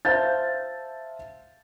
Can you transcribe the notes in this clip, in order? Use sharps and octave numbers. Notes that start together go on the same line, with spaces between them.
C5 E5 F5 A5 G6 A6